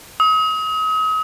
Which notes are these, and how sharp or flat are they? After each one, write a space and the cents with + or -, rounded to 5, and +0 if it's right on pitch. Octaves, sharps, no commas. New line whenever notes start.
D#6 +40